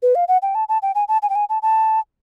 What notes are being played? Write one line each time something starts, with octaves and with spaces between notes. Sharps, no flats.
B4
F5
F#5
G5
A5
A5
G5
G#5
A5
G#5
G5
G#5
A5
A5